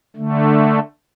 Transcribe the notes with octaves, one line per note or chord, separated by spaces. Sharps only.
D3 A3